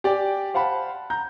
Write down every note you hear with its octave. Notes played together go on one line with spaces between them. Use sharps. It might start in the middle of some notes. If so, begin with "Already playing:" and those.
G4 D5 G5 G#5
C5 F5 F#5 A5 B5
A#5 G6